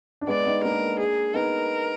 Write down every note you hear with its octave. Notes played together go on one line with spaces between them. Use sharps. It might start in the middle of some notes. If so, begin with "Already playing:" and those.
D4
G#3 B3 D5
B3 D#4
A#3 D4 A#4
G#4
B3 D#4 A#4